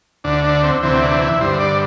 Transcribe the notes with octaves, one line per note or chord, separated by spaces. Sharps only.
D2 D3 D4
D4
C4
D2 C3 E3 C4
D4
E4
G2 D3 C5
D5